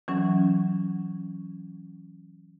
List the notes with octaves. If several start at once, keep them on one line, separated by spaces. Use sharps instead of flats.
E3 F#3 C#4